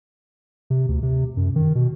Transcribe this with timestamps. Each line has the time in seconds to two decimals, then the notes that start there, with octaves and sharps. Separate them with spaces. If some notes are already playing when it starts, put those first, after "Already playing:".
0.70 C3
0.89 D2
1.03 C3
1.37 F#2
1.56 D#3
1.75 B2